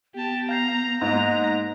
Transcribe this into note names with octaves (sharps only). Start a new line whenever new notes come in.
B3 G4 A5
F5 A#5 G6 C7
G#2 A#3 D#4 D#5 A#5